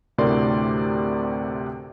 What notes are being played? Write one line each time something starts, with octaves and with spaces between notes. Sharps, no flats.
D2 A2 C3 A#4 D5 C6